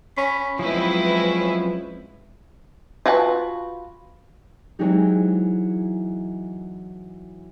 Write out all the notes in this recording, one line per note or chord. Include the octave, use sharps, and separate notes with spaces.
C#4 B5
F3 F#3 G#3 C4 C#4 E4 B4
F4 F#4 B4 F#5 A5
E3 F#3 G#3 C4 D#4 G4